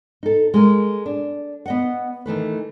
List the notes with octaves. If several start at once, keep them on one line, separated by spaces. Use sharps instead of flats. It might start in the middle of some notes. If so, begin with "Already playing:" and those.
D#4 A4
G#3 A#4
D4
B3 D#5 F#5
D#3 E3 A3 B4